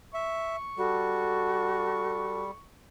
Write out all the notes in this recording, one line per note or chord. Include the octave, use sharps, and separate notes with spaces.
E5 C#6
G3 F#4 A4